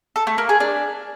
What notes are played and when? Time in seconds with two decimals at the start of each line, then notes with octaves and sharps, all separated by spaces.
0.16 A4
0.27 A3
0.38 A#3
0.49 G#4
0.60 D4